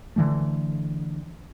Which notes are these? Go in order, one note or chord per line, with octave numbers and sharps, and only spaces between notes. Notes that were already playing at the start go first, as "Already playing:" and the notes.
D3 E3 A3